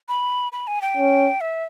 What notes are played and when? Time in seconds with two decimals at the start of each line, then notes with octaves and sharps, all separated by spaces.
0.09 B5
0.52 B5
0.67 G#5
0.82 G5
0.97 C#4
1.41 E5